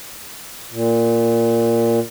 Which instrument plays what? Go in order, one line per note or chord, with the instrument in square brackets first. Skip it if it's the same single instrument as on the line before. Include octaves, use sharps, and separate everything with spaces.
[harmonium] A#2